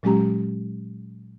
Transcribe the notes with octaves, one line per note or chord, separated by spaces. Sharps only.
A#2 F#3 G#3 C#4 G4 A#5